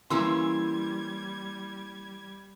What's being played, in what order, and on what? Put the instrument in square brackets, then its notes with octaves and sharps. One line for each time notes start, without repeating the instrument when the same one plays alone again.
[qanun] E3 A#3 C#4 [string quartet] G3 G#6 [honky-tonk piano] C6 E6